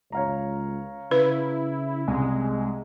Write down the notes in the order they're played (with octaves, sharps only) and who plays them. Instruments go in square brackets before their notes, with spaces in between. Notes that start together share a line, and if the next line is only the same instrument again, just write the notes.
[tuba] C#2 [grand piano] C#5 F5 A#5
[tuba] C#3 [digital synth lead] E4 [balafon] B4
[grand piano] C2 [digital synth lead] G#3